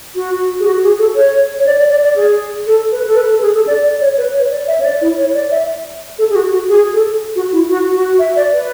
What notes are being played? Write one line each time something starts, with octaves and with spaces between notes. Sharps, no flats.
F#4
G#4
F#4
G#4
A4
C#5
C#5
D5
D5
D5
D5
G#4
A4
B4
A4
B4
A4
G#4
A4
D5
D5
C#5
B4
C#5
D5
E5
C#5
D5
E4
C#5
D5
E5
A4
G#4
F#4
F#4
G#4
A4
F#4
E4
F#4
F#4
E5
D5
B4